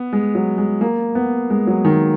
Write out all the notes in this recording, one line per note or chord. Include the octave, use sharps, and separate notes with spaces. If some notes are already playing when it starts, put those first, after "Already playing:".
Already playing: B3
G#3
F#3
G#3
A#3
B3
G#3
F#3
D#3